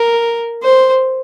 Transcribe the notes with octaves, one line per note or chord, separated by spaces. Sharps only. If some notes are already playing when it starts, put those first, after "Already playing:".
Already playing: A#4
C5